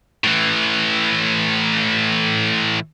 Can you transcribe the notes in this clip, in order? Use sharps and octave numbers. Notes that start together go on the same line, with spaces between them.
A2 E3